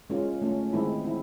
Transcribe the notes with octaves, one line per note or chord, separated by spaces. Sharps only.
G#3 C#4 F4
A3 C#4 F4
D#3 G#3 C4 E4
C4 E4